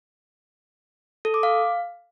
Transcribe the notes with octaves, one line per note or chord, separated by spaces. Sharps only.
A4
D6
F5